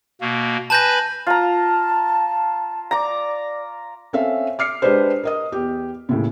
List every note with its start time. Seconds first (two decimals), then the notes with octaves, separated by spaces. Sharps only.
0.21 B2 A#3
0.70 B4 G#5 A5 B5 G6 A#6
1.27 F4 A5 A#5
2.91 D5 A#5 D6
4.13 C4 C#4 A4 E5 F5
4.59 D6 F6 C7 C#7
4.82 G#3 D4 G4 G#4 B4 C5
5.23 A#4 D#5 D#6
5.52 E2 G4
6.09 D#2 A2 C#3